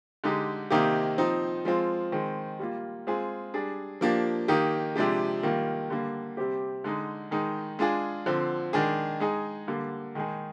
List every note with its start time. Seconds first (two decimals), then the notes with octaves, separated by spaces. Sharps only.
0.24 D3 G#3 D#4 G4
0.70 C3 D#3 A#3 D#4 G4
1.18 F3 C4 D#4
1.65 F3 G#3 C4 F4
2.12 D#3 G#3 C4
2.59 G3 A#3 F4
3.07 G#3 C4 F4 G#4
3.54 G3 D4 G#4
4.01 F3 A#3 D4 G4
4.48 D#3 A#3 D#4 G4
4.96 C3 F3 G#3 D4 G4
5.43 D#3 G3 A#3 F4
5.90 D3 G3 A#3
6.37 C3 G3 C4 G4
6.84 D3 G#3 D#4
7.31 D#3 G#3 D#4
7.79 G#3 D4 F4 G#4
8.26 D3 F3 C4
8.73 D#3 G#3 D4 G#4
9.20 G#3 D#4 G#4
9.68 D3 G3 A#3
10.15 D#3 G#3 D#4 G#4